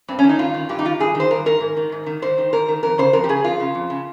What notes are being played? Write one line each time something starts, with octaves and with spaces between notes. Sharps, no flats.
G2 C4
C#4
D#3
D#4
G2 F4
D#3
G2 G4
D#4
D#3 F4
G2 G#4
D#3
C5
G2 A#4
D#3 A#4
G#2
D#3
G#2
D#3
G#2 C5
D#3
G#2 A#4
D#3
F2 A#4
C#3 C5
F2 A#4
G4
C#3 G#4
F2 F4
C#3
F2
C#3